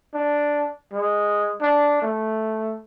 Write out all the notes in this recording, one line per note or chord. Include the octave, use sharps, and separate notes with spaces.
D4
G#3
D4
A3